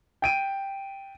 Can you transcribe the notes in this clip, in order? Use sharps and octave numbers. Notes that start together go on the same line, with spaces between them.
G5 D7 D#7